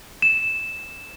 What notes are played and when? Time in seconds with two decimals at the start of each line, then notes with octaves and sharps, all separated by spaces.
0.22 E7